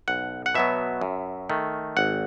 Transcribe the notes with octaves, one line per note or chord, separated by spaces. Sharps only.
B1 F#5
F#5
B2 F#3 B3 E5
F#2
D#3 A3
G#1 F#5